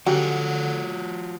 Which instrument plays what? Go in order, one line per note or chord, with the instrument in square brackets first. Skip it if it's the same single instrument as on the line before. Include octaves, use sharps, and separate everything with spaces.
[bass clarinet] D3 [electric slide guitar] F3 F#4 [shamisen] F#3 C#4 G4